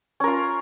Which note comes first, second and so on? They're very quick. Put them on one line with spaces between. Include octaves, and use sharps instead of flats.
C#4 A#4 F4